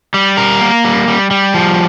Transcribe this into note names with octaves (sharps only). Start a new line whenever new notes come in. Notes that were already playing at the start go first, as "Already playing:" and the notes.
G3
A#4
A#3
G3
G3
G3
F3